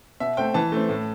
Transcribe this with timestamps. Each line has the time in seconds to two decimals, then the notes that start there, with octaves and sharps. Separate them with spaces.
0.20 B2 E5
0.37 A3 C4 G5
0.54 E3 A5
0.72 A3 C4
0.89 A2